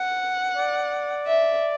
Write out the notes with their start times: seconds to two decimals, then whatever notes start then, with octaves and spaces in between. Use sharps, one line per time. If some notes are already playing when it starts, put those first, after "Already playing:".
Already playing: F#5
0.57 D5
1.27 E5